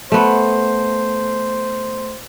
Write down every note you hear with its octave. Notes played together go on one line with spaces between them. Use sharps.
A3 B3 C5